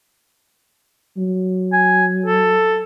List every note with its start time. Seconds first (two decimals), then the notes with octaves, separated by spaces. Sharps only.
1.17 F#3
1.73 G#5
2.26 A4